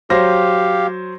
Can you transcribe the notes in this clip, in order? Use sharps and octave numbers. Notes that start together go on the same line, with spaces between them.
F#3 G4 C5 F5 A#6